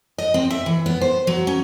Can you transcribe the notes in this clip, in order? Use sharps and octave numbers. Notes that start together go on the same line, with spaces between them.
D#5
C4
E5
E3
B3
C5
F#3
C#4